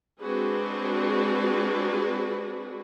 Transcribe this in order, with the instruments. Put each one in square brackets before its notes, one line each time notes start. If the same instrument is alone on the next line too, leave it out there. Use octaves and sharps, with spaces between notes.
[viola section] G#3 C4 D4 F#4 G#4 B4